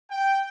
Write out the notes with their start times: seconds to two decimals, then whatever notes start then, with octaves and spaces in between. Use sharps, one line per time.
0.10 G5